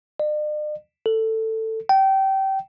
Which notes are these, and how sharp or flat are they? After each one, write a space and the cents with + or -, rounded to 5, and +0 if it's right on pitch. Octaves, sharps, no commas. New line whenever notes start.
D5 +45
A4 +15
G5 -25